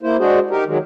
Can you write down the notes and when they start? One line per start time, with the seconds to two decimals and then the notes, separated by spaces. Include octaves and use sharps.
0.02 A#3 E4 C5
0.19 G#3 D4 F#4 G#4 C5
0.50 D#4 G4 A#4
0.66 D#3 F#3 G#3